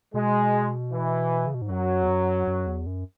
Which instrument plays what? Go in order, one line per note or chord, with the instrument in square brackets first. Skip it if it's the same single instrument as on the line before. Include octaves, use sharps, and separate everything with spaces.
[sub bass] B2 [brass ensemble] G#3
[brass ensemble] E3
[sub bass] C#3
B2
G#2
[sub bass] F#2 [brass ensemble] F#3
[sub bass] E2
F#2
F#2
E2
F#2